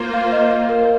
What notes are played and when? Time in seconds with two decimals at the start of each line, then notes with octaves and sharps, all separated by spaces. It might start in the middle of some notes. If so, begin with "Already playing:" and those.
Already playing: A#3 F4 C5
0.14 F5
0.27 F5
0.32 D#5
0.51 F5
0.69 A#4